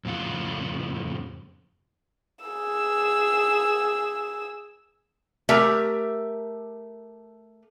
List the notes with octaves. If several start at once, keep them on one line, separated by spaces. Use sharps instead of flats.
F2 A2 C#3 F4 F#5
G#4 E6
A3 G4 A#4 E5